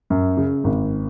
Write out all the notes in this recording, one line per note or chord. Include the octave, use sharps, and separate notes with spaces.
F#2
C#3
G#1